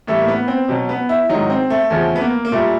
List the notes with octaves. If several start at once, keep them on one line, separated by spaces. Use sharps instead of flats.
A2 E3 G3 A3
A#3
B3
C4
B2 F#3
B3
E4
G#2 D#3 F#3 D#4
C4
A3
E2 C#3 F3 A3
B3
A#3
A#3
A#2 G3 A3